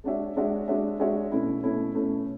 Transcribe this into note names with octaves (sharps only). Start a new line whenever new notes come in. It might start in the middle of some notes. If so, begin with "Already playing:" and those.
G#3 D4 F#4 C#5 E5
G#3 D4 F#4 C#5 E5
G#3 D4 F#4 C#5 E5
G#3 D4 F#4 C#5 E5
B2 A3 C#4 E4
B2 A3 C#4 E4
B2 A3 C#4 E4